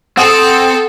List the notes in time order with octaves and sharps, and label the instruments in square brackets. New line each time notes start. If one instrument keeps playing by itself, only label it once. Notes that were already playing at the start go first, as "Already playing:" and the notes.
[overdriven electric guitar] C4 [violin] A4 [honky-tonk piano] F#5 D#6